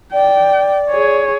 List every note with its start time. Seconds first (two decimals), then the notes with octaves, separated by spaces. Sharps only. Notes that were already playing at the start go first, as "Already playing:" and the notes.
0.13 D5 G5
0.90 G#4 C#5